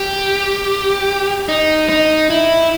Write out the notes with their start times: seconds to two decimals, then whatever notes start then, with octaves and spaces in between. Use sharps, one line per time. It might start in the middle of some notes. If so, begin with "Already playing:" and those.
Already playing: G4
1.49 D#4
1.89 D#4
2.30 E4